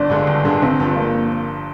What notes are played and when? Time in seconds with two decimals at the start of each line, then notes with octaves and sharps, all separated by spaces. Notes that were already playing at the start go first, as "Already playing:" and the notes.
Already playing: G1 D4
0.10 G2 D3 G#3
0.27 G1
0.45 G2 D3 G#3
0.62 G1 C4
0.80 G2 F3
0.97 A#3